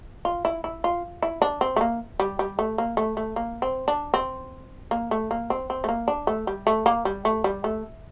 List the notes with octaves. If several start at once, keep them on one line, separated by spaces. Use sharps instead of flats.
F4
E4
E4
F4
E4
D4
C4
A3
A#3
G3
G3
A3
A#3
A3
A3
A#3
C4
D4
C4
A#3
A3
A#3
C4
C4
A3
A#3
D4
A3
G3
A3
A#3
G3
A3
G3
A3